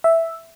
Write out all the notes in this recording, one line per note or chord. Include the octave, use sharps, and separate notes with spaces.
E5